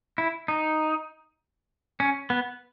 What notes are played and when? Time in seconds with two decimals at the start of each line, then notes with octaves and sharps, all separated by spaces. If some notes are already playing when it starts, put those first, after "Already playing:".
0.18 E4
0.48 D#4
2.00 C#4
2.30 B3